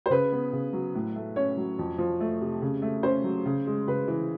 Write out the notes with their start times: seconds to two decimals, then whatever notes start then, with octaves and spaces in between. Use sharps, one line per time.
0.06 C5
0.10 C#3 B4
0.32 B3
0.53 C#3
0.73 F#3
0.95 A2
1.16 A3
1.36 C#4 C#5
1.57 F#3
1.79 F2
1.98 F3
2.20 A3
2.41 C3
2.62 C#3
2.82 A3
3.03 C#4 C5
3.24 F#3
3.46 C#3
3.67 G#3
3.88 C#3 B4
4.08 E3